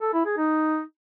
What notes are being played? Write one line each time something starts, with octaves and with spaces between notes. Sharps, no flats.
A4
E4
G#4
D#4